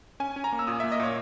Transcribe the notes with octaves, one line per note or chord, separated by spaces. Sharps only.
C#4 G#5
C#4
A#5
A#3
E6
A#2 D#6
A#3 E5
D#5
A#2 C#5